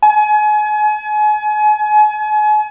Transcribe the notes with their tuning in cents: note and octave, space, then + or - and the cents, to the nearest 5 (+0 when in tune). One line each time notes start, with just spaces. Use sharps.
G#5 +35